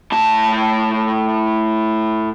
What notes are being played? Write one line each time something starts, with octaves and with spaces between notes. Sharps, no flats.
A2 A5